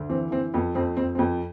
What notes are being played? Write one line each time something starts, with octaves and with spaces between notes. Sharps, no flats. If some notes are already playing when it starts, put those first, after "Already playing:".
Already playing: D2
E3 C4
E3 C4
F2 B3
F2 C4
F2 C4
C4
F2 B3